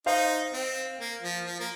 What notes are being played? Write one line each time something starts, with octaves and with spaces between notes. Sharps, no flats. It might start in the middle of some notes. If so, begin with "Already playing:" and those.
D#4 C5 F5
C4
A#3
F3
F3
A#3